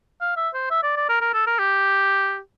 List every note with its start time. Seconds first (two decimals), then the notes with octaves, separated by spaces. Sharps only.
0.21 F5
0.37 E5
0.54 C5
0.71 E5
0.83 D5
0.97 D5
1.09 A#4
1.21 A#4
1.34 A4
1.47 A#4
1.59 G4